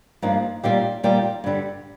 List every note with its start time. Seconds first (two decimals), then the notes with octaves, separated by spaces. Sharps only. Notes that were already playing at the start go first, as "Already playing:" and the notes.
0.22 G2 F3 A#3 D#4
0.63 A#2 G3 A#3 D#4 G4
1.03 A#2 G3 A#3 D#4 G4
1.44 G2 D3 G3